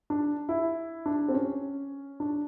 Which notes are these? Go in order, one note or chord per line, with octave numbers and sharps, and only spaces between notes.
D4
E4
D4
C4
C#4
D4